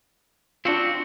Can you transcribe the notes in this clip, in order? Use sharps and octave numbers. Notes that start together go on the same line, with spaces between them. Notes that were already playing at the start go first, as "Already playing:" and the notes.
C4 D4 F4 F#4